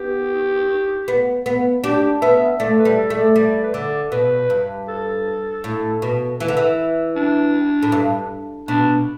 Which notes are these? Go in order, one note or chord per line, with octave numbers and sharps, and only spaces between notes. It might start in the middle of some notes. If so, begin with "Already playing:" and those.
Already playing: B3 G4
B3
B3
D4 G4
B3 E5
A3 D5
B4
G3
A4
A3
D5
G3 D5
B4
D3 D5
B2 B4
G2
A4
A2
B2
E3 B4
D3
E3
D4
A2
G2
B2 D4